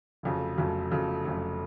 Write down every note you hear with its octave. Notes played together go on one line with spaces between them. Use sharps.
F1 F2 C#3 F#3
F1 F2 C#3 F#3
F1 F2 C#3 F#3
F1 F2 C#3 F#3